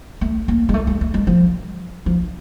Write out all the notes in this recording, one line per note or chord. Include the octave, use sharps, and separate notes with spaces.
A3
A#3
G#3
A3
G#3
A3
G#3
F3
F3